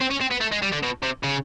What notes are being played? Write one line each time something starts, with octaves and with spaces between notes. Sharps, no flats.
C4
C#4
C4
B3
A3
G#3
G3
D3
B2
C3
C#3